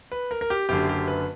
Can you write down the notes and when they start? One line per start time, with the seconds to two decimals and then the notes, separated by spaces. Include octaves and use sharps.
0.12 B4
0.31 A#4
0.41 A#4
0.50 G4
0.69 F#1 F#2 D3 G4
0.89 G4
1.08 B4